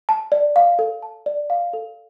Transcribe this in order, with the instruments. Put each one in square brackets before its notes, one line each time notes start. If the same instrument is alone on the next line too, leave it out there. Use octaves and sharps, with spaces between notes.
[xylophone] A5
D5
F5
A4
A5
D5
F5
A4